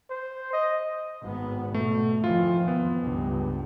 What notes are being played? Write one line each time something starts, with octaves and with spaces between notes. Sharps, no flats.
C5
D#5
G#1 B3
B2 A3
F2 D#3 E3 F4
F2 B3
C#2 G2